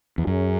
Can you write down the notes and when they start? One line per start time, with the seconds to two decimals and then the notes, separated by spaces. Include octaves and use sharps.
0.18 E2
0.27 F#2 F#3 C#4 G#4